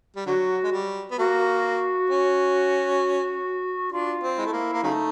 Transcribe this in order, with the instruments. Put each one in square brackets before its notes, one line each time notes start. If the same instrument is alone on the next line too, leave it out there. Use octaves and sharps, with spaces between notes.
[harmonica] G3
[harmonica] D3 F#3 [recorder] F#4
[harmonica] G#3
G3
B3
[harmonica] A#3 [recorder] F#4
[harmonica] C#4
[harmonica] D4 [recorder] F4
[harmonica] C4
[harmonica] G#3 [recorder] E4
[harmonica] A3
A#3
A#3
[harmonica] C#3 F#3 A3 [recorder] D#4